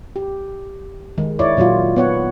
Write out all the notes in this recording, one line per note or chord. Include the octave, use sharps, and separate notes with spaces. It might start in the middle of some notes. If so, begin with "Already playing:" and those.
G4
D#3 G#3
E4 C#5 D5
A#2 F#3 A#3 F4
B3 C#5 F#5